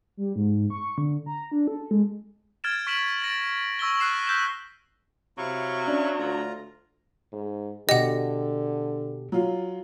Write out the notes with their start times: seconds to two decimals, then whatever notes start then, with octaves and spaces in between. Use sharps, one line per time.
0.17 G3
0.36 G#2
0.70 C#6
0.98 D3
1.26 A#5
1.52 D4
1.67 A4
1.91 G#3
2.64 F6 G#6 A6 D7 E7
2.87 C#6 F6 B6 D7 E7 F#7
3.22 A6 A#6 D7
3.79 C#6 E6 A#6 G7
4.00 F6 F#6 C7 E7
4.27 E6 G6 B6 E7
5.38 C3 F#3 E4 F5 C#6
5.87 C#4 D4 D5
6.18 D2 F4 A#5
7.33 G#2
7.89 B2 D3 G4 D#5 F#5
9.32 F#3 F4